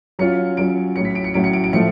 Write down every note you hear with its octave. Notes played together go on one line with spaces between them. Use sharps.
F#3 C#4 F4 C#7
F#3 C#4 F4 D7
A2 F#3 C#4 C#7
B6
D7
C#7
A2 F#3 C#4 D7
C#7
D7
D7
A2 F3 A3 C#7